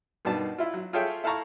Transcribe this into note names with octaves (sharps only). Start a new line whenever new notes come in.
G2 B2 D#3 D4 A5
E4 F4
F#3
F4 G#4 A4 C#5 E5 G5
E4 A4 F5 A5 A#5 C#6